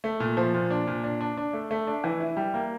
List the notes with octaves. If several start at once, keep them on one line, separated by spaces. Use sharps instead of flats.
A3
A#2
F3
A#2
D4
A#2
D4
D4
D4
A3
A3
D4
E3
E4
G3
A#3